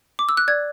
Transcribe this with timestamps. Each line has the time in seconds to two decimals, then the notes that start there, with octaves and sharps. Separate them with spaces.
0.19 D6
0.29 E6
0.37 F#6
0.48 D5 G#6